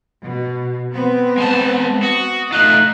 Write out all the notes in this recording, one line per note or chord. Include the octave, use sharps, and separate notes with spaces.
B2
B3 C4
G#3 A5
F#4 D#6
A3 D#4 F4 F#6